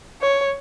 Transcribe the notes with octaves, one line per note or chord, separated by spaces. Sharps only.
C#5